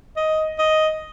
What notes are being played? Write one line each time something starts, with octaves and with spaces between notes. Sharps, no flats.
D#5
D#5